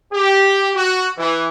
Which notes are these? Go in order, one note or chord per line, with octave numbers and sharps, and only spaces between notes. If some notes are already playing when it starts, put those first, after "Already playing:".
G4
F#4
E3